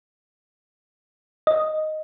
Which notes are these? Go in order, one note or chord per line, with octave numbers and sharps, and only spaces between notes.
D#5